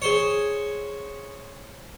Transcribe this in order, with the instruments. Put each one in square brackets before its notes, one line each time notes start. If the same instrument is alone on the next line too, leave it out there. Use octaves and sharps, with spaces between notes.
[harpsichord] G#4 C5 C#5